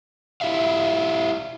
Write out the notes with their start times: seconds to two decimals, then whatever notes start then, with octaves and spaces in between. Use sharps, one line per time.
0.41 E4 G4 E5 F5